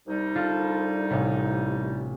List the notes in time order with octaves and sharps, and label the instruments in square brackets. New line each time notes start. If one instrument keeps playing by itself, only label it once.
[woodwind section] C2 G3 D#4
[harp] D4 F4 A4
A1 C3